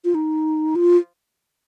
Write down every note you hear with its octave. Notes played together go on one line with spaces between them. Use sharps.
F4
D#4
F4